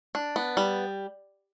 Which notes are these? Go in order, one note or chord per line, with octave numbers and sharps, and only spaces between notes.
D4
B3
G3